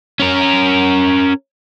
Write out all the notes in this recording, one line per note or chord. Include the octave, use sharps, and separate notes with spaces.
C#4 A#4